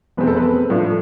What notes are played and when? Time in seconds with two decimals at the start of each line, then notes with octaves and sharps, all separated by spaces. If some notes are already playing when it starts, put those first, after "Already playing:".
0.17 F1 E2 B2 G#3 C4 B4
0.27 A4
0.37 B4
0.70 A2 F3 A3 D4 F4